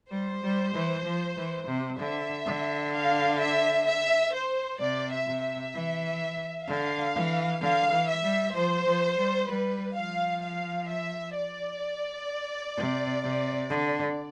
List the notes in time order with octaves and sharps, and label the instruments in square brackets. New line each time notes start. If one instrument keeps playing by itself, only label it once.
[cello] G3 [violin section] C5
[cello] G3
E3
F3
E3
C3
[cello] D3 [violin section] E5
[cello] D3
[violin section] F5
E5
E5
C5
[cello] C3 [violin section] D5
[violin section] E5
[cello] C3
[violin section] E5
[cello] E3
[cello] D3 [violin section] F5
[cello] E3
[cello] D3 [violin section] F5
[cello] E3
[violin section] E5
[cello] G3
[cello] F3 [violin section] C5
[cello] F3
G3
[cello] G3 [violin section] B4
[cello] F3 [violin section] F5
[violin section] F5
E5
D5
[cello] C3
C3
D3